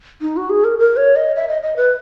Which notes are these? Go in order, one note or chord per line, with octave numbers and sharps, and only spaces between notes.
D#4
F#4
G#4
A#4
A#4
C#5
D#5
E5
D#5
D#5
B4